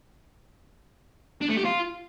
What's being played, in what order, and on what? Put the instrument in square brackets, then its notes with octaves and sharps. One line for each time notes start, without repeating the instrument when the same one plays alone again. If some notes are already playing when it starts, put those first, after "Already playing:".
[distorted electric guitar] D4
A3
G4
F4